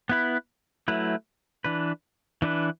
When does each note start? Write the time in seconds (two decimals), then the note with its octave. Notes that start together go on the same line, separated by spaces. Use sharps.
0.09 B3 E4 B4
0.88 F#3 A3 E4 B4
1.65 E3 D4 B4
2.42 E3 D4 B4